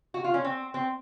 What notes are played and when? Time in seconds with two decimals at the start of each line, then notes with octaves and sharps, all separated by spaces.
0.14 F#4
0.24 F4
0.34 C#4
0.44 C4
0.74 C4